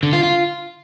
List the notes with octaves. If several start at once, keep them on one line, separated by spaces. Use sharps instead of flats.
D3
F4
F4